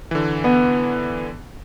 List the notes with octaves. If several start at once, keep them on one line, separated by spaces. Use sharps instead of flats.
D3 E3
B3